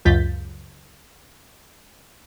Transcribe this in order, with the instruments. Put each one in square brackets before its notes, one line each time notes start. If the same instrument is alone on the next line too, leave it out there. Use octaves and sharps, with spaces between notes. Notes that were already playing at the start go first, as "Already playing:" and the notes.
[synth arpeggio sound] C#2 F#2 F4 G6 A6 B6